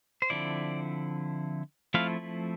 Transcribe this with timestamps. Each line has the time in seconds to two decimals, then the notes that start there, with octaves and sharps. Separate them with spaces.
0.22 C5
0.30 D3 F3 C4 E4 D5
1.94 F3 A3 C4 E4 F5